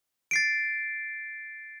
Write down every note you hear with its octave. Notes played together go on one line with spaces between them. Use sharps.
A6 C7 D7